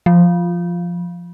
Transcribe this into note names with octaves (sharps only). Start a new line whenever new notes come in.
F3